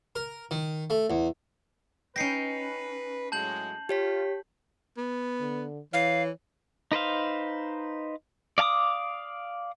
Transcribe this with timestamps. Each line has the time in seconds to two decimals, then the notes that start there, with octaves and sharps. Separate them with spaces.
0.16 A#4
0.51 D#3
0.90 A3
1.10 E2
2.16 C#4 D#4 B4 G5 A#6 C7 C#7
3.32 A2 F#3 G#3 A5 G6 F#7
3.89 F4 G4 C#5 B6
4.97 B3
5.40 D3
5.93 E3 C#5 F5
6.92 D#4 B4 C5 F5
8.58 D5 F5 G#5 D6 D#6